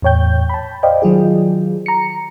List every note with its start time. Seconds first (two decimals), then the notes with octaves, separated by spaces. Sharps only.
0.02 E2 A2 C#5 G5 G6
0.50 A5 B5
0.83 C5 D5 D#5 F5 G5
1.02 D#3 F#3 F4 G#4
1.86 A#5 C#7